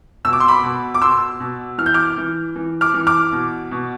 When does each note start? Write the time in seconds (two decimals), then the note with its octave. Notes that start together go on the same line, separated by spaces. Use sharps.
0.25 B2 E6
0.33 D6
0.40 C6
0.48 B5 D6
0.63 B2
0.94 D6
1.02 B2 C6 E6
1.40 B2
1.78 E3 F6
1.86 G6
1.94 D6 F6
2.17 E3
2.56 E3
2.81 D6 F6
2.94 E3
3.07 D6 F6
3.32 B2
3.71 B2